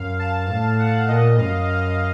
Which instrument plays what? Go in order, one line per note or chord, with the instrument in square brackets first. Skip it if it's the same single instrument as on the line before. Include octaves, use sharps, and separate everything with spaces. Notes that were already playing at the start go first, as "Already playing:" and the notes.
Already playing: [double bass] F#2 [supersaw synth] F5
[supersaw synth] A5
[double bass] A2 [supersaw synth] A5
[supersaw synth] F#5
[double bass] A#2 [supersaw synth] D#5
[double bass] F#2 [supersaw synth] F5
[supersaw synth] F5